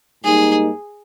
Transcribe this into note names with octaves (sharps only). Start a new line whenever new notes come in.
G#2 G3 A#3 D#4 G#4